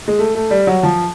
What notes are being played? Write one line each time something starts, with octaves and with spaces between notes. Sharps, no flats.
G#3
A3
A3
G3
F#3
F3